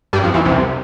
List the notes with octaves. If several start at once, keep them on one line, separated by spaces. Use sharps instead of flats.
G2 G3
F2 F3
E2 E3
C2 C3